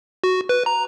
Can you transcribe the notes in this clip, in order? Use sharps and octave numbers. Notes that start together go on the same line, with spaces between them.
F#4
B4
A#5